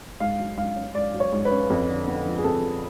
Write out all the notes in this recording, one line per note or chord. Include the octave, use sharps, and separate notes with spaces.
G#2 F5
F#3
G#2 F5
C#4
G#2 D5
F#3
C#5
G#2
B4
C#4
F2
D3
B3
F3
G#4
F2 A4
D3